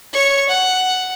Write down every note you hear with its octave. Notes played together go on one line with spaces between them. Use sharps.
C#5 C#6
F#5